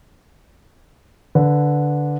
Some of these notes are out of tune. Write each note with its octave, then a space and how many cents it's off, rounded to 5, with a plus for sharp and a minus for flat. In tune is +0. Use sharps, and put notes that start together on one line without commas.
D3 -5 B4 +0